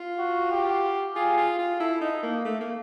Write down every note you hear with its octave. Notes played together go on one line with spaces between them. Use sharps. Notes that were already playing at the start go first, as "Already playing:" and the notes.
Already playing: F4
F#4
G4
F4 G#4
F4
F4
E4 A4
D#4
A#3
A3
A#3